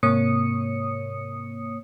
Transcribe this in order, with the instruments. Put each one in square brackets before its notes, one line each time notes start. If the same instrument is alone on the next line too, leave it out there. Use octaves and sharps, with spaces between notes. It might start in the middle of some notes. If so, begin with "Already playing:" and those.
[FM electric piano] G#2 C3 A#3 C#5 D#6 C#7